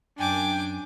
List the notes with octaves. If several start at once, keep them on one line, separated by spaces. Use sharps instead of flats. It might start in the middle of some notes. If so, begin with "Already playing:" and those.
F#2 D4 G5 G#5 D6